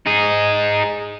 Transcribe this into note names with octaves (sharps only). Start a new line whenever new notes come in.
D#4 G#4